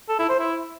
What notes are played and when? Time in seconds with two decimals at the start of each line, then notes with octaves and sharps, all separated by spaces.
0.09 A4
0.19 E4
0.29 C5
0.39 E4